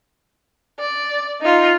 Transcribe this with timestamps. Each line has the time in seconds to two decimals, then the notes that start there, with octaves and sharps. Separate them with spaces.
0.79 D5
1.41 D#4 F4